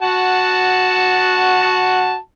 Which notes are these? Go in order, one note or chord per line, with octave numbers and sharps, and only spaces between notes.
F#4 F#5 A5